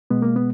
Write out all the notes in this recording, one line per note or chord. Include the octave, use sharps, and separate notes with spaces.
B2 G#3 B3
A#3
B3